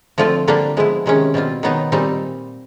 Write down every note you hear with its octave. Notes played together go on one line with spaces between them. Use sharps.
D3 F3 A3 C4 F4
D3 G3 A#3 D4 G4
F3 G#3 B3 E4
C3 D#3 G#3 C#4
B2 G3 C4 F4
D#3 F#3 B3 D#4
A#2 G3 C4 D#4